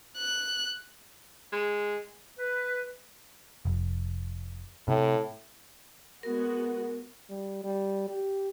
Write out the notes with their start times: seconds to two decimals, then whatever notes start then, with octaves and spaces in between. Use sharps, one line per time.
0.17 F#6
1.53 G#3
2.39 B4
3.65 F1
4.88 A2 C3
6.23 G#3 B3 F#4 A#4
7.30 G3
7.64 G3
8.09 G4